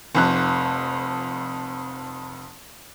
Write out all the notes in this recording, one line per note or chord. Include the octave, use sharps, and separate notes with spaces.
F1 F2 F#6